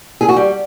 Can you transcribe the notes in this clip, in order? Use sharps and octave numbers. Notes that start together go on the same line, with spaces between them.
G#4
F#4
G3